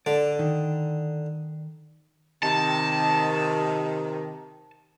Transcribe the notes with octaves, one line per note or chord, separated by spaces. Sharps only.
D3 D5
D#3
C3 D#3 A5